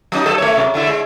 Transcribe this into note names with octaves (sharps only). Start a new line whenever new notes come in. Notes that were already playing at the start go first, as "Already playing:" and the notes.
F#3 C#4 D#4
F#3 A4
A3 E4 C#5
C3 F#3
D3 A3 E4
G#3 E4